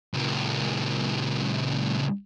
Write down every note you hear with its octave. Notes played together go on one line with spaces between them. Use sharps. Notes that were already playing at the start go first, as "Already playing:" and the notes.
C#2 A#2